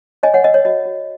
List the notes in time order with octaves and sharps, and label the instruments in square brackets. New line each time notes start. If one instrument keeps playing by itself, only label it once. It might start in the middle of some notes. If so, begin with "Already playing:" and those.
[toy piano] C#5 D#5 G#5
C#5 F#5
A#4 D#5
C#5
F#4 D#5
F#4